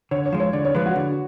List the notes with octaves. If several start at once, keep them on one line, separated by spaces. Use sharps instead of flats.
D3 C#5
C#5
F3 G#3
C#5
D3 D5
C#5
F3 G#3 B4
F#4
D3